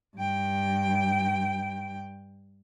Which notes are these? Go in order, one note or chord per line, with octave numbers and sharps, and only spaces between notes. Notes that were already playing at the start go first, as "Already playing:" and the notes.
G2 G5